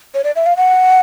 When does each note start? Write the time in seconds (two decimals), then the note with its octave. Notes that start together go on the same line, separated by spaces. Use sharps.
0.14 C#5
0.24 D5
0.36 E5
0.46 F5
0.57 F#5